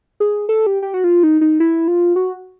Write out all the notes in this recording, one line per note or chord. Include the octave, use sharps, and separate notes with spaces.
G#4
A4
G4
G4
F#4
F4
D#4
D#4
E4
F4
F#4